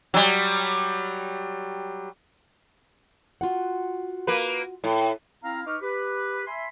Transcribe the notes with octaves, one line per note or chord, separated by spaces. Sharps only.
F#3 G3
F4 F#4 F#5
A#3 B4
A2
C4 E4 F5 A#5
D#4 B4 D#5 C#6 D6 F6
G4 B4
E5 G#5 B5 C6